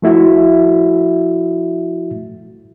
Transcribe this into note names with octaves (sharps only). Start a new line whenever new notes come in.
F3 A3 E4 F#4 E5